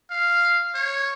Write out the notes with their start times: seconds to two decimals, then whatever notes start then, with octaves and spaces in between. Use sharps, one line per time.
0.11 F5
0.75 C#5